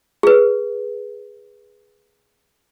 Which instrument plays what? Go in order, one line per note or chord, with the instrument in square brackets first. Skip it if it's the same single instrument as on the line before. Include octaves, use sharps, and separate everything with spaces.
[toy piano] G#4 B4